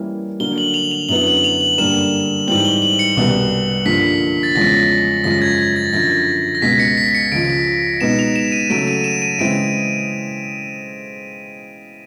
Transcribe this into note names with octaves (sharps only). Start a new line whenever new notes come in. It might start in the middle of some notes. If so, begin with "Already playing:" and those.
Already playing: E3 G3 A#3 C#4 E4
D3 F#3 A#3 G7
F#7
F7
F7
F#2 D3 F#3 B3 E4 F#7
F#7
F7
F#7
G2 D3 G3 A#3 E7
G#2 E3 G3 C4 F#7
G7
F#7
C#7
C2 B2 G3 B3
G2 D3 F3 A#3 B6
A6
E2 C#3 F3 G#3 C#4 A#6
F#2 C#3 F3 G#3 C#4 A#6
G#6
G#6
A6
F#2 D3 F3 A#6
A#6
C#2 B2 G#3 B6
C#7
B6
C#7
C#2 C#3 F3 D7
B2 G#3 B3 D#4 E7
F7
E7
D#7
C#3 F#3 A3 D7
D#7
E7
D#7
C#3 E3 G#3 C4 E4 D7